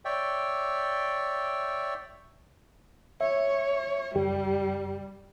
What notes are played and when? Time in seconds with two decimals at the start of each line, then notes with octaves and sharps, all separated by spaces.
0.05 C#5 D5 E5 G5
3.21 C#5 E5
4.15 C#2 F#2 G3 G4